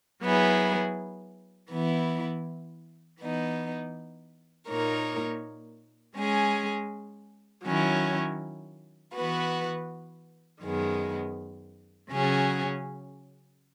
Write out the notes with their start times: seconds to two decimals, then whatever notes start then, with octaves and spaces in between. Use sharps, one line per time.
0.22 F#3 B3 E4 G#4
1.70 E3 B3 E4
3.19 E3 B3 D#4
4.68 A#2 A#3 D#4 A#4 C#5
6.16 G#3 C#4 G#4
7.65 D#3 F#3 C#4 E4
9.13 E3 B3 F#4 B4
10.62 F#2 D#3 G#3 B3
12.10 C#3 F#3 C#4 G#4